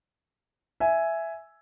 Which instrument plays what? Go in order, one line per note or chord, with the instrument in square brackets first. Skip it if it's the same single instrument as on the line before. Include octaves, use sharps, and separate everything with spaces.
[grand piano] E5 G#5